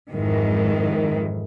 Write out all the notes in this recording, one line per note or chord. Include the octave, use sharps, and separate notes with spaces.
F2 G#2 D#3 E3